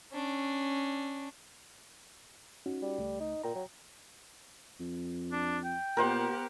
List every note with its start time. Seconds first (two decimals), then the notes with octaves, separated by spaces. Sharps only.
0.12 C#4 D4
2.66 C#4 D#4 F#4
2.82 G3
2.98 C#2 A3
3.20 D#4
3.44 A#2 G5 A#5
3.55 F#3
4.80 F2
5.32 D4
5.64 G5
5.97 A#2 B3 G4 A#4 C5 F#5